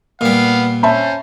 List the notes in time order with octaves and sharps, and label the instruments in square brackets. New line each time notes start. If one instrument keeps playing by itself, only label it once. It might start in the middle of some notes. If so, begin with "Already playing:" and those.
[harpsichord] A#2 G3 [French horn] B3 [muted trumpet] F5
[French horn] C#4 [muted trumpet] C5 [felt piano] E5 A5 B5